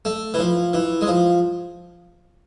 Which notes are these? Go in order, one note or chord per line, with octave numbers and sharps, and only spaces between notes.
A3
E3
F3
E3
G#3
F3